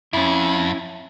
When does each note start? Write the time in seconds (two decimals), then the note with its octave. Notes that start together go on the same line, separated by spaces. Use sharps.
0.13 F2 C#4 E4